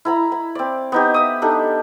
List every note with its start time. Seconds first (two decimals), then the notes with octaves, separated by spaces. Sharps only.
0.05 E4 A#5 B5
0.32 B5
0.55 C4 D5
0.92 B3 D#4 G4
1.14 E5 D#6
1.42 D4 D#4 G4 A4